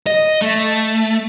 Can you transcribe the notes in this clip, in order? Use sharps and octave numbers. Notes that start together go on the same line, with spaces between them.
D#5
A3